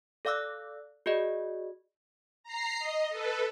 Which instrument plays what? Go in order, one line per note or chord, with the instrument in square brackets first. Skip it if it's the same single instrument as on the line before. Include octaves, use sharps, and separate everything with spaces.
[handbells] A4 D5 F5 D6 E6 F#6
F#4 G#4 D5 D#5
[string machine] A#5 C7
D#5
A4 B4